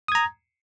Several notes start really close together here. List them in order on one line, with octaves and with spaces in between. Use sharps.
D#6 G#6 A#5